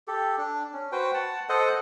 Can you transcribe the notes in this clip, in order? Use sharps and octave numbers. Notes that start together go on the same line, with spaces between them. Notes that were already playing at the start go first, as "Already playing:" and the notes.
G4 A4
D4
C#4
F#4 B4 C5 G5
F#5 A5
A4 C5 D#5 F#5